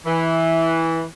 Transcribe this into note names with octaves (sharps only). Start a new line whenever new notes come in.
E3